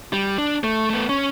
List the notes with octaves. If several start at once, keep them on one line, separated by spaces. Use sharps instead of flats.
G3
D4
A3
A3 B3
C#4